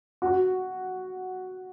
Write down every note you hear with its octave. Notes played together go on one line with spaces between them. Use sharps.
F#4